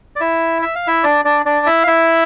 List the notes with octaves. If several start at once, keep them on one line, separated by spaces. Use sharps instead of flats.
D5
E4 E5
E5
F5
E4 E5
D4 D5
D4 D5
D4 D5
E4 E5
F5
E4 E5